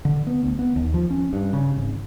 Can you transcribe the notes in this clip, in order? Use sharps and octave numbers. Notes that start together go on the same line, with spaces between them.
D3
B3
D2
B3
D#2
F3
C#4
G2
C#3
G#1